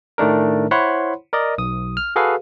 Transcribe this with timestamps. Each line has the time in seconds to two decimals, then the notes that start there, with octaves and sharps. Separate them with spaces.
0.18 A2 D#3 A3 D4 A#4
0.71 E4 C5 C#5 F#5 B5 C6
1.33 A#4 D5 D#5
1.58 B1 D#6
1.97 F6
2.16 F#4 G#4 A4 B4 F5